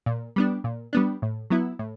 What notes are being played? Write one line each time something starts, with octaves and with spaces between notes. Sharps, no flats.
A#2
G3 B3 D4
A#2
G3 B3 D4
A2
F#3 B3 E4
A2